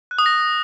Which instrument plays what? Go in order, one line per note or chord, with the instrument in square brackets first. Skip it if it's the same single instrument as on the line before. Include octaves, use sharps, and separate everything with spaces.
[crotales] F#6
D#6
A#6